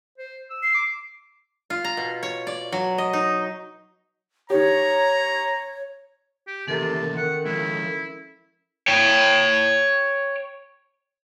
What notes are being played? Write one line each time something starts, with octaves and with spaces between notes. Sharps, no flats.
C5
E6
C7
D6
F4
A#5
B2
C#5
D5
F#3
D#5
D#4
D#3 G4 C#5 A#5
G4
D#2 C3 E3 C#4 A4 A#4 A5
D#3 F#5
F3 G#3 E4
C#5 G5